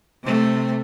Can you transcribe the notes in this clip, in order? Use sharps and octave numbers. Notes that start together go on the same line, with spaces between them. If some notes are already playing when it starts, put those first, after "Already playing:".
C3 A3